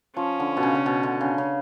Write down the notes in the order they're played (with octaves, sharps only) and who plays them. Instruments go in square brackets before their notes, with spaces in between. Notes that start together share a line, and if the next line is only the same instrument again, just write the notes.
[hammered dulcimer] F3 [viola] C#4
[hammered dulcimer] D3
B2
C#3
C#3
B2
D3
C#3
C#3